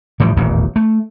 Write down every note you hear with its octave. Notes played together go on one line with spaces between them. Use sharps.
A2 E3 F3 G3
D#1 A1 E2
A3